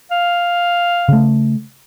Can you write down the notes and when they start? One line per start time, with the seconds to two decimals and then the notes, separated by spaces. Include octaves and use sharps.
0.11 F5
1.09 C#3 A3